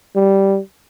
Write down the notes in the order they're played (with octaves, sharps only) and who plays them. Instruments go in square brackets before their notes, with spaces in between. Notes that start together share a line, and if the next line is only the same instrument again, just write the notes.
[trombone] G3